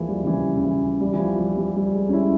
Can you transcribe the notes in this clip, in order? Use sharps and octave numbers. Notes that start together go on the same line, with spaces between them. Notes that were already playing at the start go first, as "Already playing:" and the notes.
Already playing: E3 F3 G#3 A#3
G3
C#3
E3
C#3
E3
G3
E3
F3
G3
G3
G3
G#3
C#4
E4